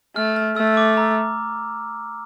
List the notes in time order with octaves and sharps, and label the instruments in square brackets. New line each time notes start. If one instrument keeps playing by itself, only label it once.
[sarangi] A3 [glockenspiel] F6
[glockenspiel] F6
[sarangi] A3 [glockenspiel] E6
[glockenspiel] D6
A#5